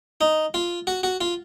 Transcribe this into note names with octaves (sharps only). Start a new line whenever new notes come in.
D#4
F4
F#4
F#4
F4